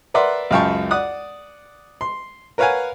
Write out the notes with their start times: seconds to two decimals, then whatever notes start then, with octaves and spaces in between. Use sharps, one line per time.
0.14 A#4 B4 D5 E5 F#5 C6
0.51 C#2 F#2 F5 G5 A5 C#6
0.91 D5 F#5 D#6 F#6
2.01 C6
2.58 A#4 B4 C#5 F5 F#5 G#5